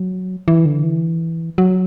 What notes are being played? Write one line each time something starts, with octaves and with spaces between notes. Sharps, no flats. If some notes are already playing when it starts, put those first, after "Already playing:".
Already playing: F#3
E3
D3
E3
F#3